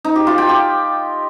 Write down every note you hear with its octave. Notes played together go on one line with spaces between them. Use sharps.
D#4
G4
F4
G5
G4